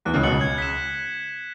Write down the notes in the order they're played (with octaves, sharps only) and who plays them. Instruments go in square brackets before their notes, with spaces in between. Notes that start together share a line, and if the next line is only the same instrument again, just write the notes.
[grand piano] E2 E3 [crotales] F#6
[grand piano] C#2 C#3
[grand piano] B1 B2 [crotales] C#7 F#7
[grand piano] C#2 C#3
[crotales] G#6
B6 E7